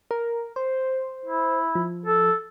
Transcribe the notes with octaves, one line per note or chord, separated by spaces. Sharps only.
A#4
C5
E4
F3
A4